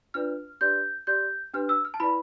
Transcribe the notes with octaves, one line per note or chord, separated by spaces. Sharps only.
D4 F4 B4 D5 F6
D4 G4 B4 D5 G6
G4 D5 G6
D4 G4 B4 F6
E6
F6
A5
E4 B4 D5 B5